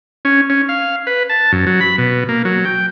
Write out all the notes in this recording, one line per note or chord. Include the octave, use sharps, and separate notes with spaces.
C#4
C#4
F5
B4
A5
F#2
F#3
B5
B2
A#3
F#3
G5